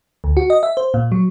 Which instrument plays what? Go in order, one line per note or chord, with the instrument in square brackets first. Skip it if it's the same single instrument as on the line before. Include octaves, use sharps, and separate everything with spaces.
[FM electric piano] D2
F#4
D#5
E5
C5
A#2
F#3